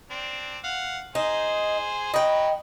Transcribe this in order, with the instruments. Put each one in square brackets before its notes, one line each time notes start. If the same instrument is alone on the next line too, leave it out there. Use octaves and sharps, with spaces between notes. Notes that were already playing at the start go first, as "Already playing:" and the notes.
[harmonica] C4 D4
F5 F#5
[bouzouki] D#4 [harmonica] G#4 C5
[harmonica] F#3 B5 [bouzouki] D#5 G5